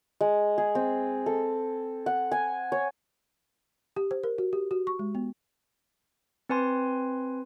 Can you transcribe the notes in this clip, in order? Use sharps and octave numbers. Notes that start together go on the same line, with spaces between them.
G#3
G#4
C4
A4
F#5
G#5
C#5
G4
C5
A#4
F#4
G4
F#4
C#6
G#3
B3
C4 B4 G#5 C6